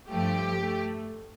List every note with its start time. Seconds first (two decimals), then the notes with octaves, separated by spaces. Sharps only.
0.09 G2 F3 A3 G4
0.60 A3